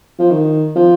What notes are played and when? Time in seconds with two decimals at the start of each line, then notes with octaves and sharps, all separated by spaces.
0.19 F3
0.31 D#3
0.76 F3